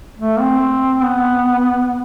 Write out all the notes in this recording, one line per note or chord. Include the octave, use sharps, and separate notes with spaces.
A3
C4
B3